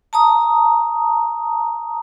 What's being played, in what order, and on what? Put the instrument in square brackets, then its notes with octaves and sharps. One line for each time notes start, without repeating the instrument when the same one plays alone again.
[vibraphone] A5 A#5 D#6